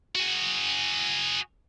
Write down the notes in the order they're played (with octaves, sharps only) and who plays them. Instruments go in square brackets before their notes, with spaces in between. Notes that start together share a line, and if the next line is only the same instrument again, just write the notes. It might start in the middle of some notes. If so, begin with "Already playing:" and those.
[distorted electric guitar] F#4 G#4